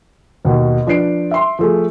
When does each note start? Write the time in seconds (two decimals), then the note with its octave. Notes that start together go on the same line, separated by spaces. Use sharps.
0.45 D#2 B2
0.87 F3 D4 B4 C7 D7
1.31 E5 C6
1.59 F3 A3 G#4